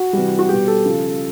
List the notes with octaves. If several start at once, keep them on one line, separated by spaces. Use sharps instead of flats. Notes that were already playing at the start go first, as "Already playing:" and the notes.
Already playing: F#4
C3 E3 G3
F#4
B2 G3 G4
A4
C#3 F3